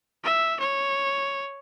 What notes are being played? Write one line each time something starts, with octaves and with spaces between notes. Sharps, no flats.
E5
C#5